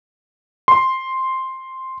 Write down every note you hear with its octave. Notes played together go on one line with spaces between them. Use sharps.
C6